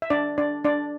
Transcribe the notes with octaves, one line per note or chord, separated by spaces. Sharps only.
E5
D4 D5
D4 D5
D4 D5